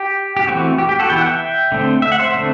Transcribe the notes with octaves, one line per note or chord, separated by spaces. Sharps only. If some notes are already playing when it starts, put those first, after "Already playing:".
Already playing: G4
G4
E3 A3 C4 F#4
G4
G4
F#4 A4
E3 B3 G5
F#5
E5 G5
D3 A3 C4
E5
F#5
C5 E5
D3 A3 C4